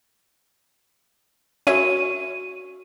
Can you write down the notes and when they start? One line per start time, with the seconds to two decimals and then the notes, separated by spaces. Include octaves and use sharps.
1.67 C#4 F#4 A#4 C#5 E5 C#6 D#7